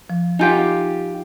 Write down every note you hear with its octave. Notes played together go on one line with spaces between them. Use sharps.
F3
D#4 F4 G4 G#5 G6